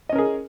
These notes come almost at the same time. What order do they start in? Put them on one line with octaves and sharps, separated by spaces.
D#5 C#4 A#4 G#4